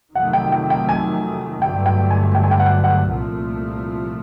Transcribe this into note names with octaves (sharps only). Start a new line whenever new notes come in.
F2 C3 D#3 F#3 A3 F#5
G5
G5
G5
G#5
G2 D3 F#3 A3 G5
G5
G#5
G5
G#5
G5
F#5
F#5
C2 A#2 F3 A3